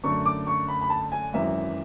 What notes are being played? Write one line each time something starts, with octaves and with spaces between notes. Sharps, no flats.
F#2 D3 A3 C#6
D6
C#6
B5
B5
A5
G#5
G#1 F#2 E3 E5